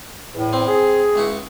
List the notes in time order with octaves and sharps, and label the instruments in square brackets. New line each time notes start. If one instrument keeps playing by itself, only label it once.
[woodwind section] E2 A2
[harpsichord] C4
[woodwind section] G#4
[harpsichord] C#2 E4 F#4